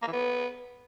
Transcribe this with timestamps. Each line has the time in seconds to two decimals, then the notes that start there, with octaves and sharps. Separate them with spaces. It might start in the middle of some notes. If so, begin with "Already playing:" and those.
0.02 A#3
0.08 E3
0.13 B3